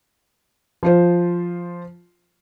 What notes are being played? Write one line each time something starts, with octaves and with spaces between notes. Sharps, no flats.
F3 F4 C5